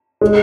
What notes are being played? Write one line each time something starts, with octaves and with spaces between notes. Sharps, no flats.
G#3